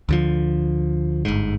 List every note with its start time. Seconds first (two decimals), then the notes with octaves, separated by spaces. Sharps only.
0.09 D2 D3 F3
1.25 G1 G#2